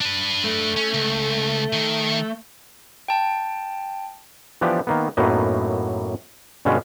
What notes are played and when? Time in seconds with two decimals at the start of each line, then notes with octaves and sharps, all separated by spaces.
0.01 D4 B4
0.45 A3
0.77 C#4
0.94 C#2
1.73 D#3
3.08 G5 A5
4.61 E3 F3 B3 D4 G4 D5
4.87 D#3 A#3 B3
5.17 F#2 A2 F#3 A#3 B3 D#4
6.65 G2 B2 D3 G#3 C#4 F4